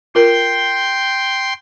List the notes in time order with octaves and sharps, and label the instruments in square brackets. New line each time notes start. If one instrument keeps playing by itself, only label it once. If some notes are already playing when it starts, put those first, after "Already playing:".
[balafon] F4 A#4 [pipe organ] G5 C6